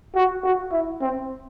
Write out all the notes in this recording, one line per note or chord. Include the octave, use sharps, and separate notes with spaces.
F#4
F#4
E4
C4